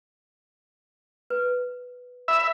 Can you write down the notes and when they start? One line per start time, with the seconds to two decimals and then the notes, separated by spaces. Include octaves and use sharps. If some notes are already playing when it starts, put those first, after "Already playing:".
1.30 B4
2.28 E5 B5